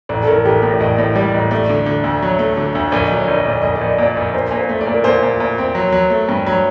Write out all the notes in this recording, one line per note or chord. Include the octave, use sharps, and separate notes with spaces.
A1 D5
A4
A1 A#4
A1 G4
A2 G4
D5
A1 D#5
A2 D5
G3 D5
A1 D#5
A3 D5
D3
D3
D2
F#3
A3
D3
D2
A#1 D5
F#3 D#5
D5
A#1
D#5
A#1 D5
A#1 D#5
D5
A#1
D#5
A#2 D5
A#1
A#2 C5
A#2
C5
A3
D5
A#2
A#4
A#2 C5
A#2
A#2
C4
F#3
F#3
A3
G2
F#3